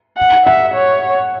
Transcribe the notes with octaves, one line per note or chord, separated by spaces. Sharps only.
F#5
E5 F#5
C#5